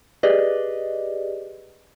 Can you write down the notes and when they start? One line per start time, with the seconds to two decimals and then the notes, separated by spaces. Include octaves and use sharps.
0.23 G4 G#4 B4 D5 D#5